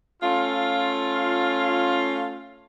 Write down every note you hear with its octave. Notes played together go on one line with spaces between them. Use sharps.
A3 C#4 F4